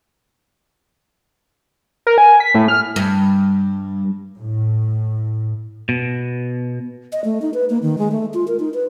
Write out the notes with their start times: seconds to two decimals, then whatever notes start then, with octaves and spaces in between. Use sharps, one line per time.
2.07 A#4
2.18 G#5
2.40 B6
2.55 A2
2.68 F6
2.96 G2
4.37 A2
5.89 B2
7.13 D#5
7.25 A3
7.42 D#4
7.54 B4
7.70 A#3
7.82 D#3
7.98 G#3
8.11 A3
8.34 F4
8.48 A#4
8.60 D#4
8.74 B4